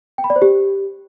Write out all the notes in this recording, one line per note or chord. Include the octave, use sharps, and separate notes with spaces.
G5
B5
D5
C5
G4